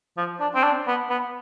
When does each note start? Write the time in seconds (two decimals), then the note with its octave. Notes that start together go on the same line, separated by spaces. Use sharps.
0.17 F3
0.40 D4
0.55 C4
0.64 D4
0.88 B3
1.10 B3